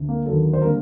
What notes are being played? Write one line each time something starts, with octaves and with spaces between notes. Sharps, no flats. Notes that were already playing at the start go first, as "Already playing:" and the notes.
Already playing: D2
A#3
D#2 D3 F#3 A4
C5
D3 G3 A#3 A#4